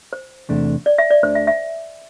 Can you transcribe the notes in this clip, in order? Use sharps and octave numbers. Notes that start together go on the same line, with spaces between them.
C5
E2 C3 A3 D4
D5
E5
D5
D2 D3 A3 D4 C5
E5
E5